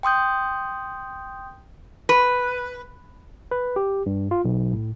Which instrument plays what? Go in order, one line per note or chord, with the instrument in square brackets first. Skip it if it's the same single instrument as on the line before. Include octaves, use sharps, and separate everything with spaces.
[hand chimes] G5 C6 D#6 G6
[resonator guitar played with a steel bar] B4
[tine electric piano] B4
G4
G2
F4
B1
A2